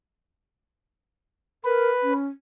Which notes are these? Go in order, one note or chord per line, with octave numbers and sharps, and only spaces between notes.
A#4 B4
C#4